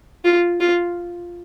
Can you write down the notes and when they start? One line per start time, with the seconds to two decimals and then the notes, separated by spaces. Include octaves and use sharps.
0.25 F4
0.60 F4